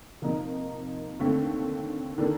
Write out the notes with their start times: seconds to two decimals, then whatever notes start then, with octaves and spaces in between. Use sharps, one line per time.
0.22 C3 F3 A#3 D#4 A#4
1.19 D#2 D3 A3 C4
2.18 D#3 A#3 D4 A4